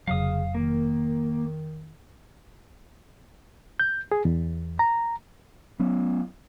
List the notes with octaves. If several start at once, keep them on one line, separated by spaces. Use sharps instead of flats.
F1 C#3 F#3 F5 D#6
D#3 A#3
G6
G#4
E2
A#5
F#3 B3 C#4